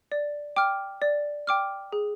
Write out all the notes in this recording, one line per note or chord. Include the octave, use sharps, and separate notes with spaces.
D5
G5 D6 F6
D5
G5 D6 F6
G#4